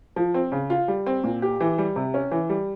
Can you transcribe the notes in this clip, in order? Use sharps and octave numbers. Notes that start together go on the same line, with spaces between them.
F3
C4
C#3
F4
G3
C4
A#2
G4
E3
G3
C3
C#4
E3
G3